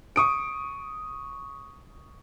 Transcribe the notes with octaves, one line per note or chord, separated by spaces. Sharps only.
C#6 D#6 D7